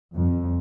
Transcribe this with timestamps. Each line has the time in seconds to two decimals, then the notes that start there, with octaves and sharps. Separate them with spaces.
0.14 F2